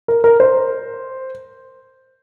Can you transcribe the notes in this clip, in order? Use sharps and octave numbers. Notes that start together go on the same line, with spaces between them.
A#4
A#4
C5